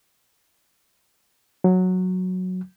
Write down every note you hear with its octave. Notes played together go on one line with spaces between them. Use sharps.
F#3